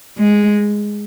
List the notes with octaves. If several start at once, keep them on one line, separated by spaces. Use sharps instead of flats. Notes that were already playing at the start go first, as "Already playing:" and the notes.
G#3